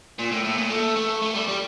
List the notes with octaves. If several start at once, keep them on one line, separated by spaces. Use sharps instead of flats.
A#2
A2
A2
A#2
A3
A3
A3
G3
G3